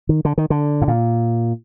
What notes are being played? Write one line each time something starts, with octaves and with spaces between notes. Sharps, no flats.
D#3
D3
D#3
D3
A2
A#2